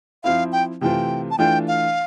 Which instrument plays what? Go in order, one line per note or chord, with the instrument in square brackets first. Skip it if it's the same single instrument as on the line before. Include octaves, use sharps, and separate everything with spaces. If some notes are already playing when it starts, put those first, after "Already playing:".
[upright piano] F3 C4 E4 [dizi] F5
[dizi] G5
[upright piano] C3 E3 A3 C4 F4 [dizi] G5
[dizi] A5
[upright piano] E3 A3 D4 F4 [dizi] G5
[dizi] F5